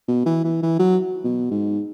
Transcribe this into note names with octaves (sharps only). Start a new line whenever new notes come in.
B2
E3
E3
E3
F#3
B2
G#2